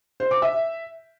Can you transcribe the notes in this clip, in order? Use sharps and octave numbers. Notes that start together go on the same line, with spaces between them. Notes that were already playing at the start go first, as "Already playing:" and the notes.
C5
D6
E5